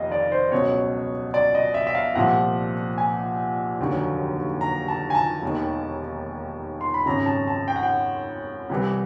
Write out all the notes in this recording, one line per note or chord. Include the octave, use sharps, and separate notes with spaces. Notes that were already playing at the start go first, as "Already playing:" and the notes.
Already playing: F1 D#2 D#5 F5
D5
C5
C#2 B2 F#3 C#5
D5
D#5
E5
E5
F5
C2 A#2 F3 F#5
G#5
F1 D#2 D3 F#3
A#5
A5
G#5
A5
E1 D#2 D#3
C6
B5
G#1 F#2 C#3 A#5
A5
A5
G5
F#5
G5
C2 C3 E3 G3